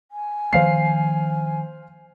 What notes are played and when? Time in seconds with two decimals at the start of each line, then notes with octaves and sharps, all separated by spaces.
0.11 G#5
0.53 D#3 F3 A#3 C5 F5 C7